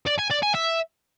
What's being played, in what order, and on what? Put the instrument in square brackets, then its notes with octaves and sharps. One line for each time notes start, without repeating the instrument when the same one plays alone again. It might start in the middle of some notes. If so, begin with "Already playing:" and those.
[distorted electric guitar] D5
G#5
D5
G#5
E5